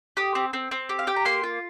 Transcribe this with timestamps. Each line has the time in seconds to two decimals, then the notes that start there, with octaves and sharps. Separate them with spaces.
0.17 G4 D#6
0.35 C4
0.53 C4
0.71 C4
0.89 G4
0.99 F5
1.07 G4 G5
1.16 A#5
1.25 A#3 C6
1.43 F4